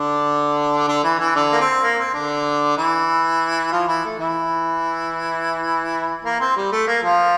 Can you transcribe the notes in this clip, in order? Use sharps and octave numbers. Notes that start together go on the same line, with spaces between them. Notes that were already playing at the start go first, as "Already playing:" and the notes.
Already playing: D3 D4
D3 D4
E3 E4
E3 E4
D3 D4
A#3
C4
A#3
C4
D3 D4
E3 E4
F3 F4
E3 E4
A3
E3 E4
A#3 A#4
C4
G3
A3
A#3
F3 F4